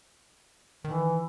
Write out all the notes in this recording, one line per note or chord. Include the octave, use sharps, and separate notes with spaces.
D#3 E3